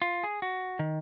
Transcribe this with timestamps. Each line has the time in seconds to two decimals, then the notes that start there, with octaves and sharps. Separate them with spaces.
0.02 F4
0.24 G#4
0.42 F#4
0.79 D#3